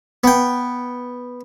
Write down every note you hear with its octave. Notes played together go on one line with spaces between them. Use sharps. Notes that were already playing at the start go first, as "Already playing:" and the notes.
B3 G5